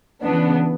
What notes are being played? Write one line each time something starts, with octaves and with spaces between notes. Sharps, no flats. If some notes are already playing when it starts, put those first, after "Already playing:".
C#3 E3 B3 D4